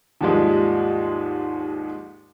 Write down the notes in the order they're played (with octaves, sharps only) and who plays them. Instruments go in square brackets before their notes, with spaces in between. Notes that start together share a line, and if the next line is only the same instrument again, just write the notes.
[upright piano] D#2 G#2 F3 G3 G#3